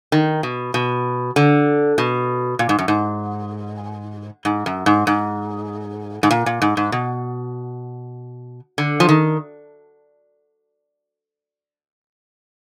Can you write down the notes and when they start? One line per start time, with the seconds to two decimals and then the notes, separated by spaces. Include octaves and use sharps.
0.12 D#3
0.43 B2
0.74 B2
1.36 D3
1.98 B2
2.59 A#2
2.69 G#2
2.79 F#2
2.88 G#2
4.45 G#2
4.66 F#2
4.86 G#2
5.07 G#2
6.23 G#2
6.31 A#2
6.46 A#2
6.62 G#2
6.77 G#2
6.92 B2
8.78 D3
9.00 F3
9.09 D#3